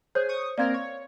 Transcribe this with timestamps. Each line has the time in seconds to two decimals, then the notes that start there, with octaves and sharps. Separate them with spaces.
0.15 G#4 C5 C#5 G6
0.29 C#6 D#6
0.58 A#3 C4 A#4 D5 F5 G#6
0.74 C#5